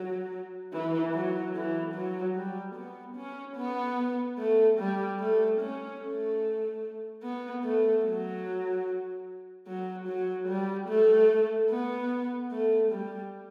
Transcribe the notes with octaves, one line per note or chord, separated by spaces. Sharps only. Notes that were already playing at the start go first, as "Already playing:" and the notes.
Already playing: F#3
E3
F#3
E3
F#3
G3
B3
C#4
B3
A3
G3
A3
C#4
A3
B3
A3
F#3
F#3
F#3
G3
A3
B3
A3
G3